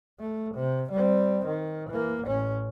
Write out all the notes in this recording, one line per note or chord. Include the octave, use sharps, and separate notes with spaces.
A3
C3
G3 C4
D#3
E3 A#3
A1 C#4